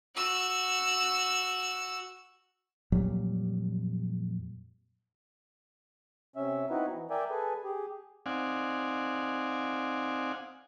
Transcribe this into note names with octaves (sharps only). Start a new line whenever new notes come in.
F#4 E6
F2 A#2 F#3 G3
C3 C#4 E5
B3 C4 D#4 E4 F#4 B4
E3
A#4 D5 E5 G5 G#5
G#4 A4 B4 G#5
G4 G#4
C4 D#4 D5 F5 F#5 G#5